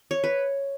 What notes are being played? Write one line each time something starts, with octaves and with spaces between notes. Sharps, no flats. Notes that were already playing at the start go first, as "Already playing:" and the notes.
Already playing: D#5
C#5
B4